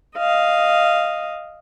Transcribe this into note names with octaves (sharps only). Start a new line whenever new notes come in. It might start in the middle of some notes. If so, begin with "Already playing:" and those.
D#5 F5